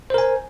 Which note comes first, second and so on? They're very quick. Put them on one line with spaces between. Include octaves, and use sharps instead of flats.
C5 A#4 G#5